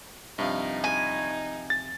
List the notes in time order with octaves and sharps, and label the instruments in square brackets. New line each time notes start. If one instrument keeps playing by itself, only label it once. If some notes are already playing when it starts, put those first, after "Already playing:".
[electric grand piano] G2 [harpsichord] C3 F3 F5 [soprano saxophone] D#4
[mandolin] G#5
[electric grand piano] A6